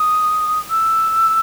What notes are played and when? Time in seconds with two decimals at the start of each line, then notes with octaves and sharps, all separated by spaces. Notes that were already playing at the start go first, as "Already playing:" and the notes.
Already playing: D#6
0.70 E6